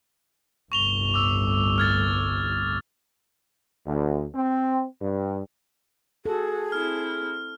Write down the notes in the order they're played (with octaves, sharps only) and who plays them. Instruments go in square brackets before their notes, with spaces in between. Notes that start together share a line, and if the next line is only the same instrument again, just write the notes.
[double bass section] G1 C2 A2 [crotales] C#6 F7 G7
[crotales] D6 E6
F6 G#6 A6
[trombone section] D2
C4
G2
[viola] F#4 [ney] G#4 [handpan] A4
[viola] C4 E4 [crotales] F6